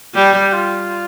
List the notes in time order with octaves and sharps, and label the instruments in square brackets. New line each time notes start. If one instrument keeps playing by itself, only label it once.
[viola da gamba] G3 [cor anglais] G4
[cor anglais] G4
F4